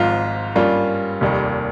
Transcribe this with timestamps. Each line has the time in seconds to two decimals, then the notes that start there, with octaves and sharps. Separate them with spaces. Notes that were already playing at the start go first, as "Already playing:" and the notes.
Already playing: G#1 G#2 F3 F4
0.55 G2 G3 A#3 C#4 F4
1.21 F1 D#2 D#3 G3